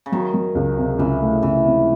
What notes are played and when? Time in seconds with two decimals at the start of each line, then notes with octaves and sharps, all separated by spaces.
0.06 C#3
0.12 D#3 F#3
0.34 F#3
0.55 C#2
0.77 C3
0.98 C#2 E3
1.20 A3
1.42 C#2 E3
1.64 C3